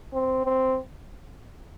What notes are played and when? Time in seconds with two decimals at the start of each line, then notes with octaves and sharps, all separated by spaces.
0.13 C4
0.45 C4